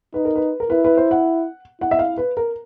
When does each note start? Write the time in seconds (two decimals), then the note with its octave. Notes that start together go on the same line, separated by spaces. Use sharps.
0.14 D#4 B4
0.25 A#4
0.36 B4
0.60 A#4
0.70 E4 B4
0.84 B4
0.97 C5
1.11 F#5
1.81 E4 F#5
1.91 E5
1.99 F5
2.18 B4
2.37 A#4